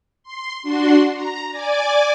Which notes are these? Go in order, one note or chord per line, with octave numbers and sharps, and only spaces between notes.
C6
D4 F#4 C6
A#5
D5 G#5 D6